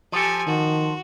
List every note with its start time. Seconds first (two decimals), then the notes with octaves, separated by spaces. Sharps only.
0.12 F3 G4 A4 G#5
0.47 D#3 F#4